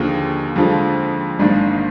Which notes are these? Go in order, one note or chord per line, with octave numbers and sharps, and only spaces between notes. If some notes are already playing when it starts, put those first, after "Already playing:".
Already playing: D#2 D3 F3 A#3 G#4
F2 D3 F3 G#3
G#1 G#2 D#3 A#3 D4